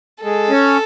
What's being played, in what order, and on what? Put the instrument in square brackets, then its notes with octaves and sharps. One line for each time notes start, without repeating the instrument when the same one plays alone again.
[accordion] G#3 [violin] A4
[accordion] C#4